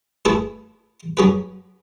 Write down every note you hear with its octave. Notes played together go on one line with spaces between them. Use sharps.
A3 E4 G#4 B4
F#3 C#4 G#4 B4